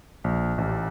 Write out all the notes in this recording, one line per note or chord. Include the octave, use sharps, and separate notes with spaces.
A#1
A1